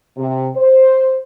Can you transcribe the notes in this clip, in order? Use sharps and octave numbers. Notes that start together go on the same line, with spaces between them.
C3
C5